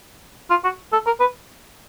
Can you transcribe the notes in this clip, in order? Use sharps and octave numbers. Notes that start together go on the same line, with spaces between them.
F4
F#4
A4
A#4
B4